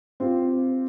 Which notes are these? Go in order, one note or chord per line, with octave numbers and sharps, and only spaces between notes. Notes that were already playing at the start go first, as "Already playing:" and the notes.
C4 F4 G4